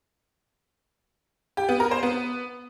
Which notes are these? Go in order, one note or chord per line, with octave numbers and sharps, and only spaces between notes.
G4
B3
A#4
C5
B3